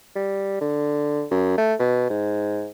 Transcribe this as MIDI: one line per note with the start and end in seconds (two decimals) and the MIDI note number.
0.16 0.59 55
0.61 1.25 50
1.31 1.54 42
1.58 1.74 57
1.79 2.07 47
2.10 2.69 44